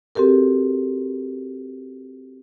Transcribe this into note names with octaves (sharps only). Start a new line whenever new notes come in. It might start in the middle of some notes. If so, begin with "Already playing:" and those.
C4 F#4 G4 A4 A#4